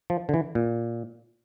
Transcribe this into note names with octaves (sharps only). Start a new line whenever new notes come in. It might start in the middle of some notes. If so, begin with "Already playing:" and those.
F3
D3
E3
A#2